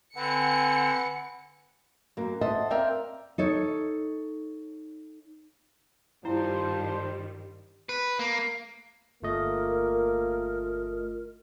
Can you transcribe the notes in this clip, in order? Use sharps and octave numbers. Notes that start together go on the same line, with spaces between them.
D3 C4 B4 F#5 G#5 C#7
F#2 A#3
C5 D#5 E5 F#5 A5
C4 A#4 D5 E5 F5 G5
D#4 A4 C#5
G2 D#3 F3 G3 E4 C5 G5
B4
A#3
G1 A3 A#3 F4 A#4 D#5